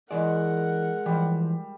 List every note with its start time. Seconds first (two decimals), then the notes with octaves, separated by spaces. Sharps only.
0.11 E3 G#3 A#4 D5 F#5
1.06 E3 F3 G3